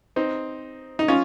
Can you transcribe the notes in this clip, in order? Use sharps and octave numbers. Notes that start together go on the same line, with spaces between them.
C4 D#4
D#4
C#4 F4